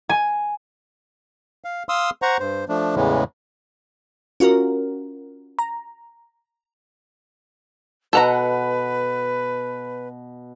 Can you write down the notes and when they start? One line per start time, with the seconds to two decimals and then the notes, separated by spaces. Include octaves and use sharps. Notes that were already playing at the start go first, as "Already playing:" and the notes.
0.09 G#5
1.64 F5
1.89 F5 C6 D#6 E6
2.22 C5 F#5 A#5 C#6
2.40 G2 C5
2.69 F3 A3 D4
2.95 E2 A2 C#3 E3 G#3
4.40 C#4 F4 F#4 A#4
5.59 A#5
8.13 B2 A4 B4 F#5 A#5